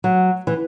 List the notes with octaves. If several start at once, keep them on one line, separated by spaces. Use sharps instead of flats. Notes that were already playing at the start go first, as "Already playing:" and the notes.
F#3
E3